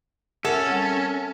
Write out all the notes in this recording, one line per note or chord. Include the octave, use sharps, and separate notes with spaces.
C#4 A4 A#4 E5 F#5
G3 C4 F#5